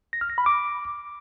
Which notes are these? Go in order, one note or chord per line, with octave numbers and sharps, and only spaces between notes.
A#6
F6
A#6
B5
D6